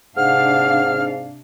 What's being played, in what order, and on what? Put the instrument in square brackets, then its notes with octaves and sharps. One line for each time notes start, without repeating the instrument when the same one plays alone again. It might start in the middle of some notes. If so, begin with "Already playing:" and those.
[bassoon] G#2 [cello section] C3 D4 F5 [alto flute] F#5 [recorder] F6